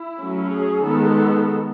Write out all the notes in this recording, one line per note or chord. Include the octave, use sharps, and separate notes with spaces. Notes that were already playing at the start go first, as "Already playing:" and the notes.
Already playing: E4
F#3 A3 C#4
G#4
D#3 G#3 B3 A4